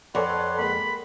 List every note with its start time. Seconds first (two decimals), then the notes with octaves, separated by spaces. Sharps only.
0.15 F2 A4 B4 C#5 D5 F#5 C6
0.59 G#3 A#3 B5